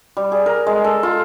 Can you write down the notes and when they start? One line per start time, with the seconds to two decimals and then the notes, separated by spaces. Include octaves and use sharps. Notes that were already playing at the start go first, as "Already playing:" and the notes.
0.17 G3
0.32 G#4
0.46 A#4
0.67 G#3
0.84 A4
1.03 F4